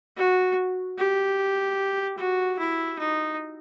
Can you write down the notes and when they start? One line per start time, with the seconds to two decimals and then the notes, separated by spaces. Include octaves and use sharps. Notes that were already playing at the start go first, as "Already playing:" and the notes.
0.17 F#4
0.98 G4
2.17 F#4
2.59 E4
2.99 D#4